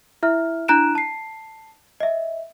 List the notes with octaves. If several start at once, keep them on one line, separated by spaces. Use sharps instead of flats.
E4 E5 F6
D4 E4 A#5 F#6 D7 E7
A5 C7
D#5 E5